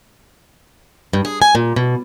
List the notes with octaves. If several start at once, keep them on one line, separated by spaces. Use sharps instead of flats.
G2
G#4
G#5
A#2
B2